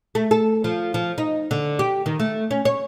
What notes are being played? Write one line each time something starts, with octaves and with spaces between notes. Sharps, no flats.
A3
A4
F3
F3
D#4
D3
G4
D#3
A3
C#4
C#5